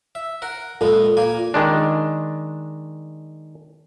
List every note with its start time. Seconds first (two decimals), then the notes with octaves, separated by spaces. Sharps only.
0.15 E5
0.42 A#4 F#5
0.81 A#2 G#3 B3 A4
1.17 A#2 A#3 G#5
1.54 D#3 G#3 D4